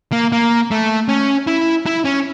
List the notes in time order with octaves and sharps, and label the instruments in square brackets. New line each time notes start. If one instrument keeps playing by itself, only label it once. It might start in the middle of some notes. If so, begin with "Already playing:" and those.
[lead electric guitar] A#3
A#3
A3
C#4
E4
E4
C#4